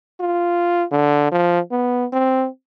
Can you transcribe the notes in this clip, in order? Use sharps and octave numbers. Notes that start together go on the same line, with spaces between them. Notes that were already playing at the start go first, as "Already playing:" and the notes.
F4
D3
F3
B3
C4